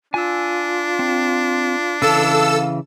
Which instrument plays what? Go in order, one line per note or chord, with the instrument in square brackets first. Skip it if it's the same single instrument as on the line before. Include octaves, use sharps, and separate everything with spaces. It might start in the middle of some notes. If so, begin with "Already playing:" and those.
[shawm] D4 [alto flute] F4 [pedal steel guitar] G#5 E6
[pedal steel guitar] C4
[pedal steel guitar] C#3 E3 [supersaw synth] A4 E6 [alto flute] F5